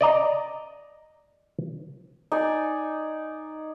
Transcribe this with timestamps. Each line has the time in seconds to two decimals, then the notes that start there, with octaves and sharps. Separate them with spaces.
0.01 D5 D#5 A#5
2.32 D#4 D5 G#5